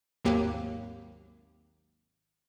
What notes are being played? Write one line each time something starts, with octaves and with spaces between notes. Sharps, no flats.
G#1 D#2 F#3 A#3 G4